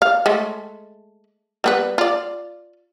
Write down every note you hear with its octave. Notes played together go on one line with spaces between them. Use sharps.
F5
G#3 A3
G3 B3 B4
F4 D5